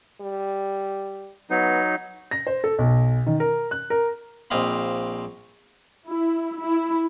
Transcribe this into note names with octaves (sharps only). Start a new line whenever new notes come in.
G3
F#3 B3 D#4
A#6
C5
A4
B1
D#3
A#4
F#6
A#4
A#1 C4 D#5 F5 B5
E4
E4